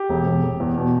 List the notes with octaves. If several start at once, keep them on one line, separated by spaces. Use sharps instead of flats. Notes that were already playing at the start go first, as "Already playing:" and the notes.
Already playing: G4
E1
E1
E1
E2
B2